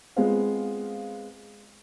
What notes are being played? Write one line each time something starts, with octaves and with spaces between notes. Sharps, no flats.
G#3 B3 C4 F4 C5 F5